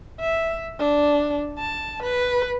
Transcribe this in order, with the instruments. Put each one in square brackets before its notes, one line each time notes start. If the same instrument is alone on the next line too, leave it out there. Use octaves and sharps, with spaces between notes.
[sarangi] E5
D4
A5
B4